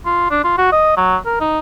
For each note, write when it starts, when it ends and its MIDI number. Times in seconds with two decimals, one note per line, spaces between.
0.05 0.26 65
0.31 0.40 62
0.44 0.54 65
0.58 0.72 66
0.72 0.97 75
0.97 1.16 54
1.26 1.39 70
1.40 1.59 63